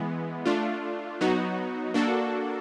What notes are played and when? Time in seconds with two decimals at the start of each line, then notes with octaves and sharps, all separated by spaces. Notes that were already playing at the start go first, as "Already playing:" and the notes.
Already playing: E3 G#3 B3
0.46 A3 D4 F4
1.21 F#3 B3 D#4 F#4
1.94 A#3 D4 F#4 A4